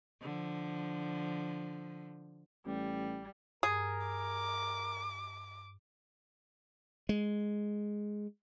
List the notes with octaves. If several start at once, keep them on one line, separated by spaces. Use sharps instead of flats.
D3 F3
A1 G3
G2 G#4 A#4
D6
G#3